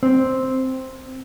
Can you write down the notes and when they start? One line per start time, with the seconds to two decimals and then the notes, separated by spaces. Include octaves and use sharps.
0.03 C4